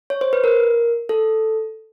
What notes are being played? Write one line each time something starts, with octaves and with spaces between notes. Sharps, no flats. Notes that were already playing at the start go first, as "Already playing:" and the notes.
C#5
C5
B4
A#4
A4